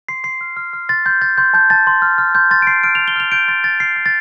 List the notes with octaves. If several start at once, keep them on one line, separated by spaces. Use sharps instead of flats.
C6 C7
C6 C7
F6
F6
F6
C6 A6
C6 G6
G6 A6
C6 G6
A5 G6
A5 A6
C6
F6
F6
C6 G6
C6 A6
D7
C6 C7
F6 D7
F7
F6
G7
F6 F7
G6 D7
C6 A6
C6 A6
F6 C7
F6
A6